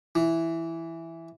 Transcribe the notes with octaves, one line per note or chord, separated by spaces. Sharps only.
E3